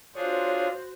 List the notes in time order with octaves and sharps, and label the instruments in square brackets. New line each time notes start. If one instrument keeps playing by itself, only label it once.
[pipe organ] D4 F4 G#4 [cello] F#4 C5 [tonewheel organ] C#5